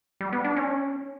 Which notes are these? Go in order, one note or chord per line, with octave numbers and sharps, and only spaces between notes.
G3
B3
D4
C#4